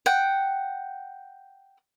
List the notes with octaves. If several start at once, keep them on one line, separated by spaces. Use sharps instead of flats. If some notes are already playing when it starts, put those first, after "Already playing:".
F#5 G5